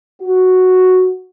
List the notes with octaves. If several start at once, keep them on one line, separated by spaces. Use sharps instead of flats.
F#4